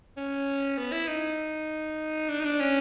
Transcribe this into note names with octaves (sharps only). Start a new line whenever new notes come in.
C#4
B3
E4
D#4
D4
D#4
D4
C#4